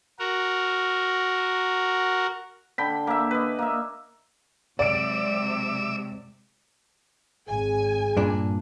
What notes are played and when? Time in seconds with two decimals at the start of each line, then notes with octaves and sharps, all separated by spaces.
0.19 F#4 A#4
2.78 D3 G5 B5
3.07 A#3 E5
3.31 B4 D#5
3.59 A#3 E5
4.79 C3 F#3 G#3 D5 E5 D6 E6 D7
7.48 G#1 G#4 G#5
8.17 G2 A#2 D4